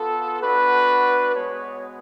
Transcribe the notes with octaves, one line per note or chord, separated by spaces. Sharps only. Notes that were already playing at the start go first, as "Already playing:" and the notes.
Already playing: B3 F4 A4
B3 D4 F#4 B4
G#3 B3 F#4 C#5